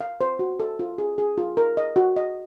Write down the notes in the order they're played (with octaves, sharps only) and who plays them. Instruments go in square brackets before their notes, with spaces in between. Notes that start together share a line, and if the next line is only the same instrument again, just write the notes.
[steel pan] F5
C5
F#4
A4
F4
G#4
G#4
F4
A#4
D#5
F#4
D#5